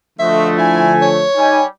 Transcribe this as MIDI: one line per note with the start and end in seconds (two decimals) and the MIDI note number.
0.19 1.26 50
0.19 1.26 53
0.19 1.26 57
0.19 0.53 66
0.19 0.53 72
0.19 0.53 75
0.19 0.48 76
0.58 0.93 64
0.58 1.07 80
1.02 1.65 73
1.37 1.67 55
1.37 1.62 63
1.37 1.62 80